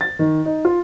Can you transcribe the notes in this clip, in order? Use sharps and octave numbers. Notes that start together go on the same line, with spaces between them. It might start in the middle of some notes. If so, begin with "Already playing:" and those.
A6
D#3
D#4
F4